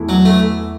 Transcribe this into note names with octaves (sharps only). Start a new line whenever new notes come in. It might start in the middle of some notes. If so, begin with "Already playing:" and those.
Already playing: E2 E3 A3 E4
F#3
A3